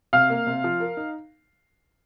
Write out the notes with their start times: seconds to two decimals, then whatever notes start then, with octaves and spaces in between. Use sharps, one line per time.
0.13 C3 F5 F6
0.30 A#3
0.47 C3
0.64 F3
0.80 A#4
0.97 D#4